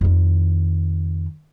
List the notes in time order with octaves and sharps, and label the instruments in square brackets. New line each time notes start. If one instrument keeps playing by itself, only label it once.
[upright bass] F2 D#3